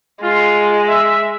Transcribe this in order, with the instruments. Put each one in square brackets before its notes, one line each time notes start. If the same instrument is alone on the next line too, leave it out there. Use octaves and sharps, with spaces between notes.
[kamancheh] G#3 [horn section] F4
[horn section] E5